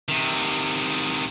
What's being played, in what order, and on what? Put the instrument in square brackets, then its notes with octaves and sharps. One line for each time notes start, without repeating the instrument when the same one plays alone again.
[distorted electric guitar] C3 D#3